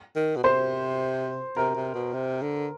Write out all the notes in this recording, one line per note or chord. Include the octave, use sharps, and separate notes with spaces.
D#3
B2
C3 C5
C3 A#4
C3
B2
C3
D3